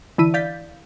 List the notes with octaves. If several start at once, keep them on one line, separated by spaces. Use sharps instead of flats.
D3 E3 E4 D#7
D5 F5 G6 A6 B6